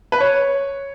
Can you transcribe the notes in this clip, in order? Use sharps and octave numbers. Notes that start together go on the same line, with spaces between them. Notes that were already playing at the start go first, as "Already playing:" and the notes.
B4
C#5